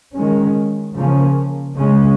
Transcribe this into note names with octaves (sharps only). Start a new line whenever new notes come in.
D#3 G#3 C#4
C#3 F3 A#3 C#4
C#3 G#3 C#4